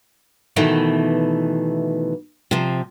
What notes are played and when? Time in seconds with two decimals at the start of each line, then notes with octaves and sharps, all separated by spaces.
0.56 B2 D#3 E3 A3
2.51 C3 F3